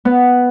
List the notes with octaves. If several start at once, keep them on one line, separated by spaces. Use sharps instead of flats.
B3